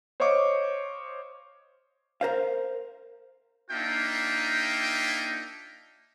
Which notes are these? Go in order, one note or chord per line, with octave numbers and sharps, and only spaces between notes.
C5 C#5 D#5 F5 C#6 D6
A#4 C5 F5
A#3 D4 D#4 F4 E5 G5